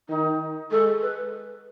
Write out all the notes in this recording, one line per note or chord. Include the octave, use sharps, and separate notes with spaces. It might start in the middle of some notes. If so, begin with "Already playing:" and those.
D#3 D#4
G#3 A4
B4